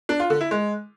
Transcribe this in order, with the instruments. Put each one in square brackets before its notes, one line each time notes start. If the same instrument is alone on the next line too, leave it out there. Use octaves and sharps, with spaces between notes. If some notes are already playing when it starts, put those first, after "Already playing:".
[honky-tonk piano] D4
F4
D3
E4
G#3